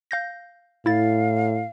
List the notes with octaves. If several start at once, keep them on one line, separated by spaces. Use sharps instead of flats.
F5 G6 A#6
A2 E4 F5 A6